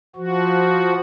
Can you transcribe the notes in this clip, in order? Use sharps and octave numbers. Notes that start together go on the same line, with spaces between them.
F3 F#4